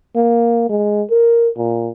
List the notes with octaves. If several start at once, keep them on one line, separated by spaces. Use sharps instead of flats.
A#3
G#3
A#4
A#2